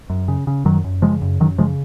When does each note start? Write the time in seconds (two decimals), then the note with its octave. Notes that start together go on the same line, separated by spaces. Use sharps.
0.10 F#2
0.28 C#3
0.47 C#3
0.65 F#2 D#3 F#3
0.84 F#2
1.02 C#3 F3 G#3
1.22 F#2
1.40 F#2 D#3 F#3
1.58 C#3 F3 G#3